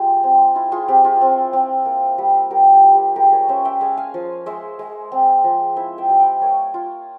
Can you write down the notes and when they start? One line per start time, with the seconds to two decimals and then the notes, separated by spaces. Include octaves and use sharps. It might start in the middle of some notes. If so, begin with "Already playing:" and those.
Already playing: G#3 F4 G4
0.24 C4
0.55 E4 F4
0.72 F4 G#4
0.88 C4 G4
1.04 F4 G#4
1.21 C4
1.53 C4
1.85 A#3
2.18 G3
2.50 G3 G4 A#4
2.73 G4
2.84 G3
2.94 G4
3.16 G#3 G4 A#4
3.33 A#4 C#5
3.49 C#4 C5 E5
3.65 E5 G5
3.81 G#3 F5 G#5
3.97 F5 G#5
4.14 F3
4.46 G#3 C5 E5
4.79 G#3
5.12 C4
5.44 F3
5.76 E4 C5 E5
5.98 E5 G5
6.09 G3
6.20 E5 G5
6.42 A#3 C#5 F5
6.74 F4